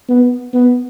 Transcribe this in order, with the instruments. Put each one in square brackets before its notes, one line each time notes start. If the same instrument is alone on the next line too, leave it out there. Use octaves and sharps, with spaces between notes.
[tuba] B3
B3